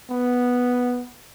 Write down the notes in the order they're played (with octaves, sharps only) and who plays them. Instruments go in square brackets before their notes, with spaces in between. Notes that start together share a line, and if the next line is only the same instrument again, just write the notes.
[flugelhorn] B3